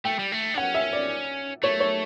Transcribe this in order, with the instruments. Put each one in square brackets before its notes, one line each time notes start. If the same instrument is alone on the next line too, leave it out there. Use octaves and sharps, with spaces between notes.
[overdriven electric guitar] A3 [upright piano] G5
[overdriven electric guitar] G3
A3
D4
[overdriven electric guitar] C#4 [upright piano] F#5
[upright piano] E5
D5
[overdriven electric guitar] A3 [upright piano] C#5
[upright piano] C#5